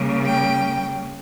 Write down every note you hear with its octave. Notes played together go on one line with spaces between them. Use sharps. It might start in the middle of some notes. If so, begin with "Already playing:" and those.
Already playing: C#3 G3 A#3
G5